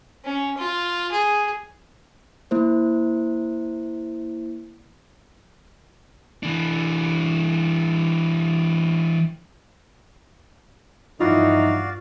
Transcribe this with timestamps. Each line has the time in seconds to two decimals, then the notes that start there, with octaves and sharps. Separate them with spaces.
0.24 C#4
0.57 F4
1.11 G#4
2.51 A#3 E4 C5
6.43 E3 D4
11.20 G2 E3 F3 D#4 F4 F#4 D5 F5